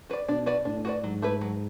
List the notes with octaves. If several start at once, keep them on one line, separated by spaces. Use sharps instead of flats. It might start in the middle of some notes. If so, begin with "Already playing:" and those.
F#4 B4 D5
B2 D4
F#4 B4 D5
A2 D4
F#4 B4 D5
G#2 F#3
A3 E4 B4
F#3